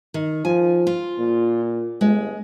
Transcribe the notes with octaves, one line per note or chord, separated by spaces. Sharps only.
D#3
F3 G#5
F4
A#2
G1 G#3